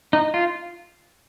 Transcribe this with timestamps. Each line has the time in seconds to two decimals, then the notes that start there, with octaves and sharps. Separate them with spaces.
0.13 D#4
0.34 F4